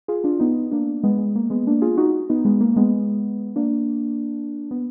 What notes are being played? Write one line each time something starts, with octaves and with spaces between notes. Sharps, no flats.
F4 G#4
D4 F4
B3 D#4
A#3 D4
G#3 B3
G#3
A#3
G#3 B3
A#3 D4
F4 G#4
D#4 F#4
B3 D#4
G#3 B3
A#3
A#3
G#3 B3
A#3 D4
B3